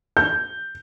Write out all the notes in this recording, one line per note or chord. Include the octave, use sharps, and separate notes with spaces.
G6